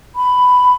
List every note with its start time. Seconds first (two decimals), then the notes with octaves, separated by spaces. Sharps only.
0.16 B5